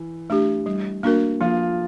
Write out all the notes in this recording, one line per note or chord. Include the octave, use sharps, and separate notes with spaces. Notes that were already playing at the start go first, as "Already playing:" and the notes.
Already playing: E3
A3 D4 G4
G3
A#3 D4 F#4 A#4
F3 A#3 F4